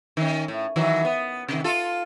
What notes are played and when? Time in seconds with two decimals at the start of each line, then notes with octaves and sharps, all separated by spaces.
0.17 D#3 C#4
0.48 A2
0.76 D#3 E3 F#3
1.05 B3
1.49 C3 D#3
1.64 F4 A4